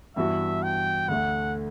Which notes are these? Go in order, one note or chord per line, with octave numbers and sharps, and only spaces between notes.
G2 E3 B3 F#4 E5
G5
D2 D3 A3 F#5